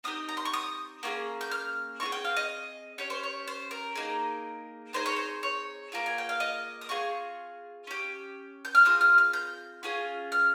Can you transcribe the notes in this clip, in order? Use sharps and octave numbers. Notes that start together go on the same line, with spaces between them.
C4 D#4 G4 D#6
A#5
C6
C#6
D#6
A#3 C#4 F4 G#4
G6
F6
C4 F4 C#6
G#4
G5
F5
D#5
C#4 G4 C#5
C5
C#5
C5
A#4
A#3 D#4 G#4
C4 D#4 G#4 C5
C#5
C5
C#5
A#3 F4 G#4
G#5
G5
F5
D#5
D#6
C4 F4 G#4 C#6
C#4 G4
G6
F6
C4 F4 G#4 D#6
F6
F6
G6
C#4 F4 G#4
F6